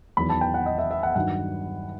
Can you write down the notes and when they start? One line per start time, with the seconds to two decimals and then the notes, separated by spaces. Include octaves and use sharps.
0.17 E2 D#3 F#3 B5
0.29 A5
0.41 G5
0.54 F#5
0.66 D#5
0.78 E5
0.91 E5
1.03 F#5
1.15 G2 D#3 F#3 F#5